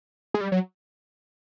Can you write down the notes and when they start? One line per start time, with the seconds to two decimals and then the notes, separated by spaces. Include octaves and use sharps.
0.34 G#3
0.41 G3
0.52 F#3